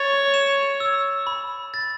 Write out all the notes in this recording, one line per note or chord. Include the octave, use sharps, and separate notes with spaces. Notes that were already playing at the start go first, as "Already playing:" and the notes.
Already playing: C#5 A6
E7
E6
B5
A6